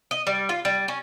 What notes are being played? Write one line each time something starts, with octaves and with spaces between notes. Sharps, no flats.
D#5
G3
F4
G3
C#4